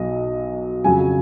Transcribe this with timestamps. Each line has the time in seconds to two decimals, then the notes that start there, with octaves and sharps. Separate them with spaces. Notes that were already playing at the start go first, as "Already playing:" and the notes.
Already playing: B1 B2 F#3 D#5
0.84 F2 C#3 F#3 G#5